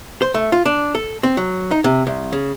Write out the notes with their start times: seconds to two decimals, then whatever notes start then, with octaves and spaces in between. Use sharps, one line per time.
0.22 C5
0.34 A3
0.52 F4
0.65 D4
0.95 A4
1.23 C4
1.37 F#3
1.71 D#4
1.84 C3
2.07 C2
2.32 C#3